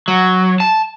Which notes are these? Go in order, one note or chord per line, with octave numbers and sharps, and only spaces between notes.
F#3
A5